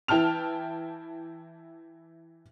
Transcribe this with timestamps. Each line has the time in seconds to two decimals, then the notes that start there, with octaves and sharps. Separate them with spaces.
0.08 E3 E4 G5 A5 F6 F7